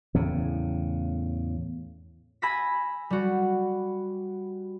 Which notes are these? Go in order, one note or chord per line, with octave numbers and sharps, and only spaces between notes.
E2 A2 C#3
G#5 B5 E6 G#6 A#6 B6
G3 F#4